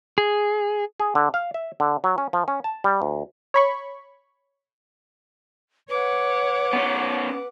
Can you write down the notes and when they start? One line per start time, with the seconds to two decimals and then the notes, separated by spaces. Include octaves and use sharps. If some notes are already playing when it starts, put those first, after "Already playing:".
0.18 G#4
1.00 G#4
1.15 D3
1.34 F5
1.54 E5
1.80 D3
2.04 F#3
2.18 C#4
2.33 F3
2.48 C#4
2.64 A5
2.84 G3
3.02 D2
3.54 C#5 B5 C#6
5.89 B4 C#5 F#5 D6
6.73 B3 C#4